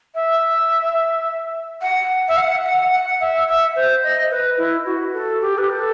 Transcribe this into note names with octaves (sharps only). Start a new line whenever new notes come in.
E5
F#5
E5
F#5
F#5
F#5
E5
E5
C5
D#5
B4
E4
F#4
A4
G4
B4
A4